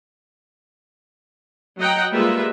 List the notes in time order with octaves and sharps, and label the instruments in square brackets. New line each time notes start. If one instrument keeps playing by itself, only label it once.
[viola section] F#3 D#5 F#5 G5 A#5
G3 G#3 A#3 F4 B4 E5